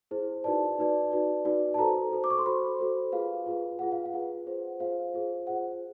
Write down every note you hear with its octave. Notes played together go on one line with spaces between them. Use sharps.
E4 G#4 C5
D#4 F#4 B4 D5 A5
D#4 F#4 B4 D5
D#4 F#4 B4 D5
D#4 F#4 B4 D5
A5
F#4 A4 C5 A#5
F#4 A4 C5
D6
C#6
C6
F#4 A4 C5 B5
F#4 A4 C5
F4 G#4 B4 F5
F4 G#4 B4
F4 G#4 B4 F#5
F5
F#5
F4 G#4 B4
F4 G#4 C5
F4 G#4 C5 F5
F4 G#4 C5
F4 G#4 C5 F#5